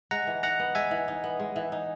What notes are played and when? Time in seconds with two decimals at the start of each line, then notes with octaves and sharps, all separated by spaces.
0.11 G#3 F#5 A#5
0.27 E3
0.43 D#4 F#5 A#5
0.60 B3
0.75 G#3 E5 G#5
0.91 E3
1.08 D#4
1.24 B3
1.40 G#3
1.56 E3
1.72 D#4